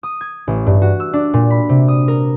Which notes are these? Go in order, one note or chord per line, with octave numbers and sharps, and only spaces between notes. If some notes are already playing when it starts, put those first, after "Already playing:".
D#6
G#6
A1
G2
F#4
E6
D4
A#2
B5
C3
D#6
A#4